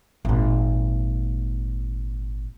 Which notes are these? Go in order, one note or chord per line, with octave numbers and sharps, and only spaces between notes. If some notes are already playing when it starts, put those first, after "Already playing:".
G#1 A#2